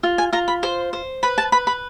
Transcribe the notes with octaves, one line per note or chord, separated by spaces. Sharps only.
F4
G#5
F4 A#5
B5
C5 C6
C5
B4 B5
A5
B4 B5
B5